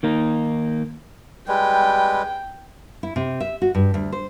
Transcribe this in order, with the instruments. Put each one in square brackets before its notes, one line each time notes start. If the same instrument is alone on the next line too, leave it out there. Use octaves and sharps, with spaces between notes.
[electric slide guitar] D#3 A#3 D#4
[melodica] G3 G#3 B4 [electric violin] G5
[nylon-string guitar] E4
C3
E5
F#4
G2
D2
C5